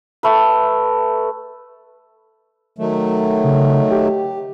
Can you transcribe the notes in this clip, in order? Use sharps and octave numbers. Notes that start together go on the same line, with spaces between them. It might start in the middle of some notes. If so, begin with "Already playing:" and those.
A3 B4
D#3 F#3 A3
C#3
G4